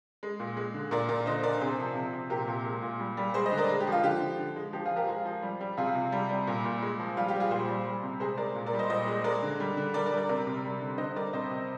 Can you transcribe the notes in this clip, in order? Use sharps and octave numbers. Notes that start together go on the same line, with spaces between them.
G#3
A#2
G#3
D3
A#2 A#4 D5
A#2 A#4 D5
D3 C5 D#5
D3 A#4 D5
C3 G#4 C5
F3
C3
C3
A#2 G4 A#4
A#2
G#3
A#2
G3
G3
G#3 G#4 C5
C5 D#5
D3
A#4 D5
G#3
G4
F3 F4
D3 G4
D3
D3
G#3
F3 G4
F4 G#4
F3 G4 A#4
G#3 F4 G#4
F3
G3
G3
C3 F4 G#4
C3
G3
G3
A#2
A#2
G#3
F3
G3 F4
G4
G3
F4 G#4
A#2 G#4 C5
G3
G3
C3
G#3 G#4 C5
G#3 A#4 D5
A#2
A#4 D5
G3
C5 D#5
A#2 C5 D#5
G#3
G#3 A#4 D5
D3
G3
D3
G3 A#4 D5
A#4 D5
G3
A#4 D5
C3 A#4 D5
C3
G3
D3
D3 C5 D#5
G3 A#4 D5
C3 C5 D#5
C3